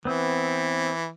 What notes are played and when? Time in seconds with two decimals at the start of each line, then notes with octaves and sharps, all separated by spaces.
0.05 E3 B3 C4